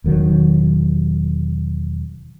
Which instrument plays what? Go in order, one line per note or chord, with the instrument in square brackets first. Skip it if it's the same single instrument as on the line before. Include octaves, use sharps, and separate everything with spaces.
[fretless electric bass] E1 D#3 F#3